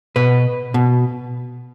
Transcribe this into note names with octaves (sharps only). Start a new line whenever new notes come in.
B2 B4
B2